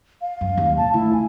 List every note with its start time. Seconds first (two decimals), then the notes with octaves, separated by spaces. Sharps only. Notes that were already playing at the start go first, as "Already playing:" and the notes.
0.22 F5
0.41 F#2
0.57 D#2
0.77 A#2 A5
0.94 D2 E4
1.13 B3 G#5